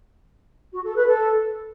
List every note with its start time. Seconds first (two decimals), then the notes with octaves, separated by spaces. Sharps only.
0.72 F#4
0.84 A4
0.96 B4
1.07 A4